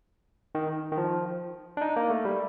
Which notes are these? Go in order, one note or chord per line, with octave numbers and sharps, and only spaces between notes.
D#3
D#3
F3
D4
D#4
A#3
A3
G3